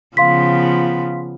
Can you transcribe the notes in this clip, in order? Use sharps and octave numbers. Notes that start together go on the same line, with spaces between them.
C#3 F3 B3 F5 C6 B6